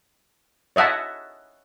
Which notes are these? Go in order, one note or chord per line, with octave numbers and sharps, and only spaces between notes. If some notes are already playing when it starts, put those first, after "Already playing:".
C#5 D#5 E5 F#5 A5